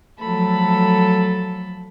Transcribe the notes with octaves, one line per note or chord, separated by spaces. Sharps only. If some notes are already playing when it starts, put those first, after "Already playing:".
F3 F#3 A3 A4 B5